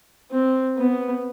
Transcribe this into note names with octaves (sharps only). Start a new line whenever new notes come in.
C4
B3